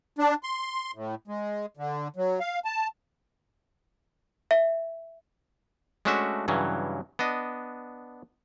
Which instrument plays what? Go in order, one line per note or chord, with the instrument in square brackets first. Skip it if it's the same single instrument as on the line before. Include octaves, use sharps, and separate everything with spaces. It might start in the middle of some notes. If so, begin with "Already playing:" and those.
[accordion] D4
C6
A2
G#3
D3
F#3
F5
A5
[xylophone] E5
[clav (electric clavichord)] G#3 A3 C#4 D4 F#4 E5
G2 C#3 E3 F#3
B3 D4 D#5